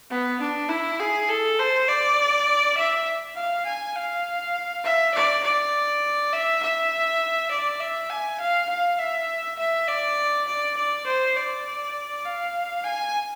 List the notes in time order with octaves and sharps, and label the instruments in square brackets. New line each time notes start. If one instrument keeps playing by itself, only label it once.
[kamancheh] B3
D4
E4
G#4
A4
C5
D5
E5
F5
G#5
F5
E5
D5
D5
E5
E5
D5
E5
G#5
F5
F5
E5
E5
D5
D5
D5
C5
D5
F5
G#5